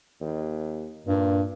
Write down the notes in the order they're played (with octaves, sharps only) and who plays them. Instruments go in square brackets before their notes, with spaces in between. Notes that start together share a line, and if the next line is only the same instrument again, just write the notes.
[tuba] D#2
[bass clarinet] G2 [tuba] A#2